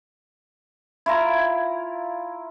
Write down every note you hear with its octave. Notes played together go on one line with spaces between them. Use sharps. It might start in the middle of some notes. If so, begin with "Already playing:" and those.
E4 F4 A#5